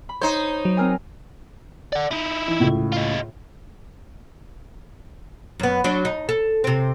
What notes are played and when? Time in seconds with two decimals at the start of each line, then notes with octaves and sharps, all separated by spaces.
0.09 B5
0.21 D#4 C5 C#5
0.65 F#3
0.77 C4 A#4 G#5
1.93 D5 F#5
2.11 D#4 E4
2.48 E3
2.60 C#2 A2
2.93 D#4 F4
5.60 F#2 B3
5.84 F#3 D4
6.05 D#4
6.29 A4
6.64 C3 C4